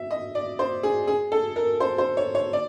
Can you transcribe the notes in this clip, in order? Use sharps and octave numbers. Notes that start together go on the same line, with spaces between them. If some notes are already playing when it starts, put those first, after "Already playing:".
Already playing: E5
D#5
D5
C5
G#4
G#4
A4
A#4
C5
C5
C#5
C#5
D5